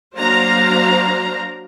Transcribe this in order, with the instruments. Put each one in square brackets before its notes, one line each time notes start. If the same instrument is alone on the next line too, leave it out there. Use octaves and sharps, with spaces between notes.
[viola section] F#3 A#3 D4 C5 F5 A#5